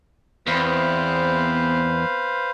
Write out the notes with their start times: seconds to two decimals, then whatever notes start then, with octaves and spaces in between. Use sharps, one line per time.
0.47 E2 B3 C4 B4 C5 F5